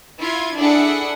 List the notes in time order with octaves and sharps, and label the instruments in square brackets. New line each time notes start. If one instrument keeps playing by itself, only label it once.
[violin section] E4 F4 G#6
D4 E4 G#4 A4 F#5